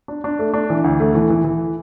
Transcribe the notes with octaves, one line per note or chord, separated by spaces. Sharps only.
D4
D4
A3
D4
E3
D2
A3
E3
E3
E3